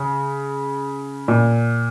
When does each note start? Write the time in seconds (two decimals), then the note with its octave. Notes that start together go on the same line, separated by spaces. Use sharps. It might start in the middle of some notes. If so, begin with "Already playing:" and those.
Already playing: C#3
1.28 A#2